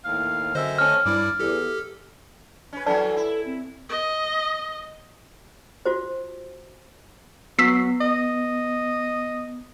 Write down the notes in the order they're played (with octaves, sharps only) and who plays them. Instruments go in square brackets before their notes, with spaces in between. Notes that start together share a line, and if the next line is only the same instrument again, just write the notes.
[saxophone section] D#2 A2 F5
[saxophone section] F#2 C4 E5 [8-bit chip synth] D3 C5 D#5
[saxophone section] A3 C4 C#4 [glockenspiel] F6
[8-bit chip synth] G2 G3 E4 [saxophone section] D5
[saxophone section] E2 [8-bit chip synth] G4 A4
[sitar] C#4 B4
[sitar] E3 F#3 C#4 [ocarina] A4 [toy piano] B4 D5 A5
[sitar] E4
[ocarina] C4
[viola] D#5
[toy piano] F4 F#4 C5
[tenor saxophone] F#3 [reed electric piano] B3 [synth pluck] E6 B6 C7
[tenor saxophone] D#5